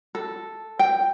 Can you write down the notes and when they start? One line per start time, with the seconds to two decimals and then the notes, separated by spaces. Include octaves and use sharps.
0.15 A4
0.79 G5